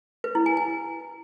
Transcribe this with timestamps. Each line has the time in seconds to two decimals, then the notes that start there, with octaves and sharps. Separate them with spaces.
0.24 B4
0.35 E4
0.46 G#5
0.57 G#5